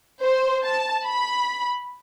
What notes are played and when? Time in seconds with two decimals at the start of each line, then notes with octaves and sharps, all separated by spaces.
0.22 C5
0.64 A5
1.06 B5